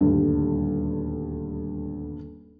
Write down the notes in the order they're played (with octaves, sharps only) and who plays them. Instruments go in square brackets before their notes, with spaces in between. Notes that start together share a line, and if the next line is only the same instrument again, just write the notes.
[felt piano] D#1 D2 G2